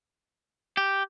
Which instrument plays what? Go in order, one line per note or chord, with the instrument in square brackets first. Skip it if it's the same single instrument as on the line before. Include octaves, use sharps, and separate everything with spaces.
[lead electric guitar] G4